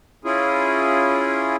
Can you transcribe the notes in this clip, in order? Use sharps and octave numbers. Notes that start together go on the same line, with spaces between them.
C#4 E4 F4 G#4